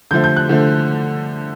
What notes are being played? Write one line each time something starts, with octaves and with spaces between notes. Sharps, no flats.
D3 F3 A3 G6
G6
F#6
D3 F3 A3